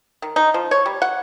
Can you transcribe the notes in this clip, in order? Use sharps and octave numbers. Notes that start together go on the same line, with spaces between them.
D#3
D#4
F3
C#5
G3
F#5